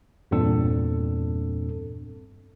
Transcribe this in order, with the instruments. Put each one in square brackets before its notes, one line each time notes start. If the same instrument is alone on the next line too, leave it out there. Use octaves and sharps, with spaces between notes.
[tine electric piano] E2 G2 A#2 C4 D4 A4